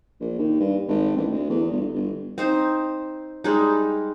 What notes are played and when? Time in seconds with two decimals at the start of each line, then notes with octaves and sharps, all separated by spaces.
0.20 A#1
0.39 D#2
0.60 G2
0.88 G#1
1.17 A1
1.31 D2
1.50 E2
1.72 G1
1.94 G1
2.38 C4 D#4 C5
3.44 G3 G#3 D#4